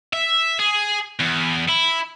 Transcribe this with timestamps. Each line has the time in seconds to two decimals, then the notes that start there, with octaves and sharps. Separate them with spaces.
0.13 E5
0.59 G#4
1.20 E2
1.69 E4